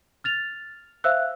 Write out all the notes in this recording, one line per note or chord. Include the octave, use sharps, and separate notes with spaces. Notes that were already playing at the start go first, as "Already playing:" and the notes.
F6 A6 F7
C5 E5 F5 E6 F#6